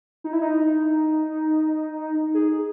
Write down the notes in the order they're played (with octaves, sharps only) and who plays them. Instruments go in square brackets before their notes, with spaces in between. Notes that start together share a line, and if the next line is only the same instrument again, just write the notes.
[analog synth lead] D#4
E4
D#4
G#4